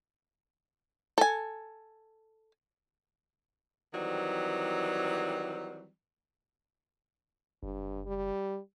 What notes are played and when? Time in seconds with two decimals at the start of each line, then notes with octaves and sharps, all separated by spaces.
1.18 A4 G#5
3.93 D#3 E3 F#3 G3 C4
7.63 F#1 G2
8.07 G3